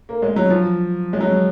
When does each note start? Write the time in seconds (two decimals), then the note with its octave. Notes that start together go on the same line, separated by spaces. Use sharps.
0.09 A#3
0.22 G#3
0.36 F#3
0.50 F3
1.13 G#3
1.20 F#3